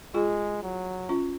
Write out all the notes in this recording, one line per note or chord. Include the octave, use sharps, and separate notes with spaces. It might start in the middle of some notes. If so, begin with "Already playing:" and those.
G#3 F4 G#4
F#3
C#4 F4